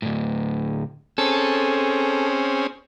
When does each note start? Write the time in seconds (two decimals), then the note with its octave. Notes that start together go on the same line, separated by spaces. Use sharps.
0.02 D2 A2
1.18 C4 C#4 G#4 A4